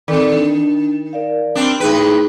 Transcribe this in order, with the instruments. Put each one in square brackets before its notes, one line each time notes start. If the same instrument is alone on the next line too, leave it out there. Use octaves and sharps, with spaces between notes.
[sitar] D#3 [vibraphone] C4 A4 D5
[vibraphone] D4
A#4 D5 F5
[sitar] G3 C4 D4
[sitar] A2 B4 [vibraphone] D#4 G#4